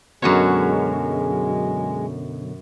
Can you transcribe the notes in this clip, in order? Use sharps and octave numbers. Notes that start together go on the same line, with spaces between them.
F#2 B2 D3 F#3 G#3 F#4 C#5